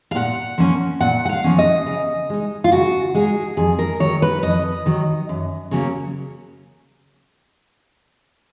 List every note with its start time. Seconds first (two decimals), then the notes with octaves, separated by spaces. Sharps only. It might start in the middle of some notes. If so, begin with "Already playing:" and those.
0.11 F5
0.15 A#2 F#5
0.58 F3 A#3 C#4
1.01 A#2 F#5
1.25 F#5
1.29 F5
1.44 F3 A#3 C#4
1.59 D#5
1.86 C#3
2.30 G#3 D#4
2.64 F4
2.71 C#3 F#4
3.14 G#3 D#4 G#4
3.57 F2 G#4
3.79 A#4
4.00 D#3 F#3 C#5
4.22 B4
4.43 F2 D#5
4.86 D#3 F#3
5.29 F#2
5.71 C#3 F#3 A#3 C#4